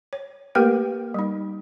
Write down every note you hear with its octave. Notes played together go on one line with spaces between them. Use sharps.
C#5
A3 A#3 G4 A#4 B4 G5
G3 D#4